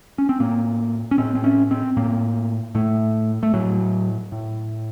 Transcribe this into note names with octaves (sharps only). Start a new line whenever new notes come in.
C#4
C4
A2 A#3
C#4
A2 C4
C4
C#4
C4
A2 A#3
A2 A3
A3
A2 F#3
A2